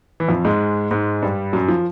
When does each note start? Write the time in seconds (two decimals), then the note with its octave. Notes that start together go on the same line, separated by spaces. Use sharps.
0.20 E3
0.29 F2 F3
0.45 G#2 G#3
0.91 G#2 G#3
1.22 G2 G3
1.53 F#2 F#3
1.68 F3